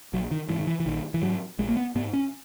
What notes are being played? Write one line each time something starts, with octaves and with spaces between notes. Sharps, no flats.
A#1 F#3
D#3
G#2 E3
D#3
E3
E3
A#1 D#3
E3
G#2 F#3
A#1 G#3
A#3
B3
G#2 B3
C#4